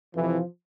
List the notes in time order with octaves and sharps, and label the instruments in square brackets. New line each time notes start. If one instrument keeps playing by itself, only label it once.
[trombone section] F2 C3 E3 [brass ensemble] F3